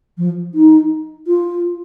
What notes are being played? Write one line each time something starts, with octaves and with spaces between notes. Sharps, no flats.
F3
D#4
F4